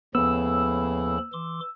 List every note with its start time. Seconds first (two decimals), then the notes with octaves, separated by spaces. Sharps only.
0.15 D#2 A2 C#3 F3 B3 B5 E6
1.33 E3 C6 D6